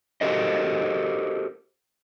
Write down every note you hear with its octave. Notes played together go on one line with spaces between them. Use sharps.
F#4 G4 A4 A#4 C5 D#5